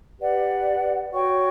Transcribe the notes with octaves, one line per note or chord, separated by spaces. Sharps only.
G4 B4 D5 F#5
F#4 C#5 G5 C#6